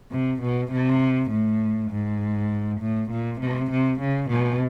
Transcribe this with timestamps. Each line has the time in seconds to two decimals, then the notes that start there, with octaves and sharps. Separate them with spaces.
0.11 C3
0.42 B2
0.72 C3
1.31 A2
1.90 G#2
2.81 A2
3.11 A#2
3.40 C3
3.71 C3
4.01 C#3
4.30 B2